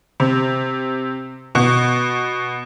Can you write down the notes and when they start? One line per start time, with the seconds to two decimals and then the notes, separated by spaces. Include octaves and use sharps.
0.20 C3
1.55 B2